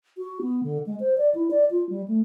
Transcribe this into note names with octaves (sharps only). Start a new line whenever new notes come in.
F#4
B3
D3
G#3
C5
D5
E4
D5
F4
G3
A3